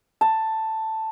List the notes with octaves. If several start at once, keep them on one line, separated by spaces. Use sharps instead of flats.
A5